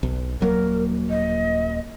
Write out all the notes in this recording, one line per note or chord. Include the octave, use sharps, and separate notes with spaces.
B1
D#1 F#3 A#3 A#4
D#5